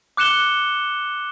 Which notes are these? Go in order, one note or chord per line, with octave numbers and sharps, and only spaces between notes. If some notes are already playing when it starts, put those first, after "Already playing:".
D6 F#6 C#7 E7 G7